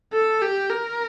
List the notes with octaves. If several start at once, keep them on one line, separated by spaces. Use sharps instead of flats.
A4
G4
A#4